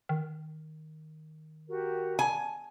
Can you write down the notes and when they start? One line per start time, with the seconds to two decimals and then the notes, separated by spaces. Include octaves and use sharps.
0.09 D#3
1.68 F#4 G4 A#4
2.19 G#5 A5